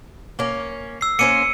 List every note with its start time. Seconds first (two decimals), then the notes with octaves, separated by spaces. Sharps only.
0.39 A#3 C#4
1.01 E6 C7
1.19 A#3 C#4 C5 C#7 D#7